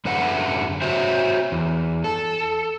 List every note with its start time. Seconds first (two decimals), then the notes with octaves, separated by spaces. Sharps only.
0.05 F#2 D3 B4 E5 F#5
0.82 F#4 C5 C#5 E5
1.52 E2
2.04 A4